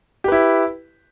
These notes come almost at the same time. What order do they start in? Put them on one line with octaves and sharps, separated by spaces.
G4 B4 E4